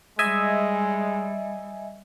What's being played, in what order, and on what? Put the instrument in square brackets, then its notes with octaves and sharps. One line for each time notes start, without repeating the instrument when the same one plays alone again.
[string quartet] G3 [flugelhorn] G#3 [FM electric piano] D#5 E5 G#5